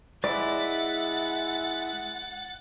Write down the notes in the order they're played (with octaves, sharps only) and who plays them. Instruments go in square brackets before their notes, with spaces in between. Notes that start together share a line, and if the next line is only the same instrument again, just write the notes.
[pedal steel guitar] G#3 E4 [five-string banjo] D5 [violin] F#5 A6